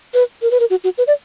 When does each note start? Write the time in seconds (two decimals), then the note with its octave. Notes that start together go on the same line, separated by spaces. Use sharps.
0.14 B4
0.42 A#4
0.51 B4
0.60 A#4
0.70 F#4
0.84 F#4
0.98 B4
1.07 D5